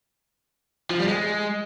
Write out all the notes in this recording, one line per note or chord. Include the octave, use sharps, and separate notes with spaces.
F3
G3
G#3